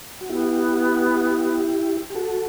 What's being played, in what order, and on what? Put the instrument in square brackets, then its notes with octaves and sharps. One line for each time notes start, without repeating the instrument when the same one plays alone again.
[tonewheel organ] F#4
[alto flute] B3 [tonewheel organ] E4 G4
[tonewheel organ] G4
F#4 A4